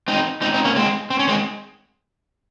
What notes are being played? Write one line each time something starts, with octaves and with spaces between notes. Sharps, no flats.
C4 D#4
C4 D#4
C4 D#4
A#3 C#4
G#3 C4
C4
C#4
G#3 C4